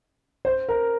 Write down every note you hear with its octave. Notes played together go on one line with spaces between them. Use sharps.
C5
A#4